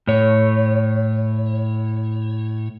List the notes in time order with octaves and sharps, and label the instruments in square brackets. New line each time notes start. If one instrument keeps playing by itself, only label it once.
[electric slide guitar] A2 C#5